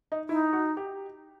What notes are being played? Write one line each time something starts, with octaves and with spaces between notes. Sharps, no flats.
D#4
D#4 E4
F#4
G4